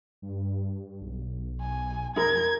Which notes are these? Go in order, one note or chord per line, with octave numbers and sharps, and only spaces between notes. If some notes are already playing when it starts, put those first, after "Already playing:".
G2
B1
G#5
F2 D#4 A#4 G#6